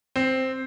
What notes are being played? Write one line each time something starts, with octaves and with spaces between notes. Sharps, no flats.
C4